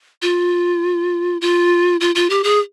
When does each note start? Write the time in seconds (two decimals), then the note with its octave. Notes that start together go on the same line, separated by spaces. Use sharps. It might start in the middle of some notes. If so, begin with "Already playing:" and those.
0.22 F4
1.41 F4
2.01 F4
2.15 F4
2.30 G4
2.44 G#4